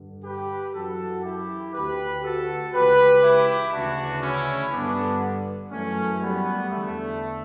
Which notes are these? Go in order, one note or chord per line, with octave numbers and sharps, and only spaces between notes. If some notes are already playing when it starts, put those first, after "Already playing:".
Already playing: G2 D3
G4 B4
F#2 E3 F#4 A4
E4 G4
D2 D3 G4 B4
F#4 A4
C#2 C#3 E3 G4 B4
E4 G4
D2 C#3 E3 D4 F#4
C#4 E4
G2 D3 B3 D4
F#2 E3 A3 C#4
G3 B3
E2 D3 A3